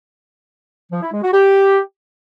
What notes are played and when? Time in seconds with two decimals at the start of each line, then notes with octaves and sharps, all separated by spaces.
0.92 F3
1.02 E4
1.13 G#3
1.23 F#4
1.33 G4